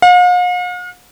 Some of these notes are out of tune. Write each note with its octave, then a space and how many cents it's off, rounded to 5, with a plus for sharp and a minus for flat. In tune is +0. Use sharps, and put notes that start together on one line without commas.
F5 +45